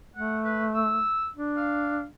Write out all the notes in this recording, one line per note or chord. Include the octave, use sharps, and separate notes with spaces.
A3 F#5
B4
E6
D4
F5